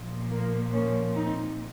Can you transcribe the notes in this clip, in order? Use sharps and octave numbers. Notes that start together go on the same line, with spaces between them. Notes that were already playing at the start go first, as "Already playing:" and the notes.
Already playing: A#2 F3
A#3
A#3 C#4
C4 D#4